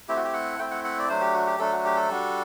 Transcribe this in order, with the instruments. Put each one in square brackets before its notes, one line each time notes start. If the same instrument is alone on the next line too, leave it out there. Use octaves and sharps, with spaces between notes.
[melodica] A3 C4 E4 G4
F#4
G4
F#5
A3 C4 E4 G5
F#5
F#5
D5
F#3 A3 D4 C5
G4
F#4
G4
F#3 A3 D4 A4
F#4
G4
A4
G3 D4 F#4